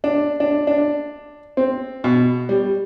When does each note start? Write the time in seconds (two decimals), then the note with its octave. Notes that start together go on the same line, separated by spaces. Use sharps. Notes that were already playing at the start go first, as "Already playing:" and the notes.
0.04 D4
0.40 D4
0.67 D4
1.57 C4
2.04 B2
2.49 G3